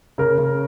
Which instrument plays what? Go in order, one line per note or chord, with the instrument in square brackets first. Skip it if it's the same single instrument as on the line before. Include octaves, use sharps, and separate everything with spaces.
[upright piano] C#3 A#4
C#3